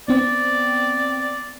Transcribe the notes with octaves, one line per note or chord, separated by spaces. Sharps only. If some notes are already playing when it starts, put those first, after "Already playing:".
B3 C4 D5